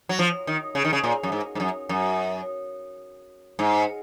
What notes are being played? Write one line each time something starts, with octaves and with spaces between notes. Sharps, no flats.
F#3
F3
D#3
C#3
D#3
C#3
A#2
F#2
G#2
G#2
F#2
F#2
G#2